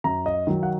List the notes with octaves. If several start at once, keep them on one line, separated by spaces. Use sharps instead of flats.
F#2 A#5
D#5
D#3 F#3
F#5